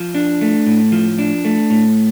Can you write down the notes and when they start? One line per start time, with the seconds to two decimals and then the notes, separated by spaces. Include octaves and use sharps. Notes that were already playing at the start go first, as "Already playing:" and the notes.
Already playing: F3
0.15 D4
0.41 A3
0.66 A2
0.92 F3
1.18 D4
1.45 A3
1.70 A2